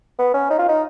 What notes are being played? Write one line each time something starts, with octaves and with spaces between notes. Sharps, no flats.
B3
C#4
D#4
F4
D#4